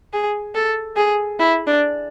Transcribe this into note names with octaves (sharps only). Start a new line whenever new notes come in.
G#4
A4
G#4
E4
D4